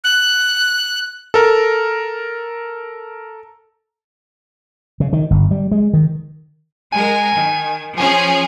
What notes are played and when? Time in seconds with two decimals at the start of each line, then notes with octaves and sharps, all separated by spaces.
0.04 F#6
1.34 A4 A#4
5.00 C#3
5.13 D#3
5.31 G1
5.51 G3
5.71 G#3
5.93 D#3
6.93 G#3 A#4 G#5
7.34 D#3
7.98 F3 C#4 G#4 G#5